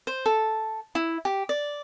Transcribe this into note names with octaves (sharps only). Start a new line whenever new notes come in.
C5
A4
E4
G4
D5